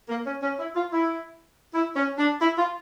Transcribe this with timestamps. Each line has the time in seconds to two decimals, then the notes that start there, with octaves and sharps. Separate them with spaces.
0.09 A#3
0.26 C#4
0.42 C#4
0.59 E4
0.75 F4
0.92 E4
1.74 E4
1.96 C#4
2.18 D4
2.40 E4
2.57 F4